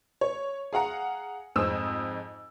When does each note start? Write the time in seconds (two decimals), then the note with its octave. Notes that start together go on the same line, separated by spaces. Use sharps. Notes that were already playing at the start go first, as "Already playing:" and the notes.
0.21 C#5
0.73 G#4 F5 F#5 A#5
1.56 F2 G#2 C4 G#4 D#6 E6